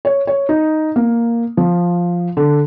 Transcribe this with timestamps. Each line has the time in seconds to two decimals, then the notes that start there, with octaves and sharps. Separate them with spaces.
0.05 C#5
0.27 C#5
0.49 D#4
0.96 A#3
1.57 F3
2.37 D3